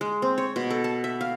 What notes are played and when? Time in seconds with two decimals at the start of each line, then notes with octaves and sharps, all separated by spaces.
0.01 G#3
0.22 C4
0.38 C#5
0.56 B2
0.70 A4
0.84 A5
1.04 E5
1.21 F5